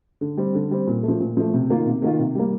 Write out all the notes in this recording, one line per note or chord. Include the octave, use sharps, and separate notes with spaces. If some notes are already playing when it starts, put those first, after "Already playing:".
D3
G3 C4
D3
G3 C4
A#2
A3
F3
A#2
F3 A3
C3
D#3 A#3 F4
C3
D#3 A#3 F4
C3
G3 A#3